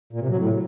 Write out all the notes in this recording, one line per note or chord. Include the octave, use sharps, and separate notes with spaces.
A#2
C3
F#3
A2